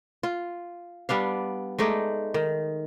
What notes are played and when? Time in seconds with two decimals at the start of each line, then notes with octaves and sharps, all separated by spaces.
0.23 F4
1.09 G3 B3 D4 F5
1.79 G#3 A3 D#4 D5
2.34 D#3